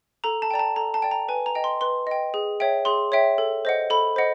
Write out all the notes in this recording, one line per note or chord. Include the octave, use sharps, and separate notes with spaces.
A4 A#5
A5
D5 G5 A#5
A5
A4 A#5
A5
D5 G5
A#5
B4 G#5
A#5
D#5 G5
C6
B4 C6
D#5 G5
G#4
C#5 E5 G5
G#4 C6
C#5 E5 G5
A4
C5 D#5 F#5
A4 B5
C5 D#5 F#5